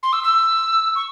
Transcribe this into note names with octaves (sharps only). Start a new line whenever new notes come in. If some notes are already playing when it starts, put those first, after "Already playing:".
C6
E6
E6
C#6